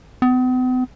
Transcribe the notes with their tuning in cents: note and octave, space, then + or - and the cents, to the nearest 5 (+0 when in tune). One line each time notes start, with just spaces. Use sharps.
B3 +45